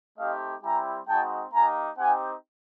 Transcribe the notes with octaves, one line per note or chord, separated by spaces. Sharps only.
A3 C4 D#4 G4 D#5 F5
G3 C4 E4 G4 G#5 A#5
G#3 C4 D#4 F#4 G5 A5
A#3 D#4 G4 G#5 A#5
C4 D#4 G4 F#5 G#5